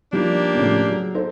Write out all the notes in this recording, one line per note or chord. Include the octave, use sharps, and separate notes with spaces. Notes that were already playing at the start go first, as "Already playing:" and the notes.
F3 G3 A#3 D4 D#4 G4
A2 C#3 F3
F#3 G#4
D#4 A4 C5